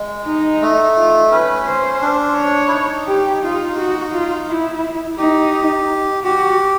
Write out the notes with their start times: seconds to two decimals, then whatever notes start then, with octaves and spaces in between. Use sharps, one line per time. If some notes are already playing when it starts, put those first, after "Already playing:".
Already playing: G#3
0.26 D#4
0.62 A3
0.96 F4
1.31 C#4 B4
1.67 C5
2.01 D4
2.36 C#5
2.67 E4
2.72 D#4
3.07 G4
3.42 D#4 F4
3.77 F#4
4.12 F4
4.48 E4
5.18 D#4 G4
6.24 F#4 G4